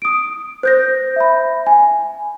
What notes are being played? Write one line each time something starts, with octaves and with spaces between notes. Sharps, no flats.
D#6 D7
C5 G6 A#6
E5 B5
G#5